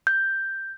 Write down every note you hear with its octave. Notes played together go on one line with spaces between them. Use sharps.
G6